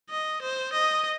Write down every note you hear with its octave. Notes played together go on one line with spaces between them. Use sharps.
D#5
C5
D#5